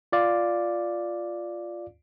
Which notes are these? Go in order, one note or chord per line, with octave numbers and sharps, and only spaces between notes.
F4 D5 F5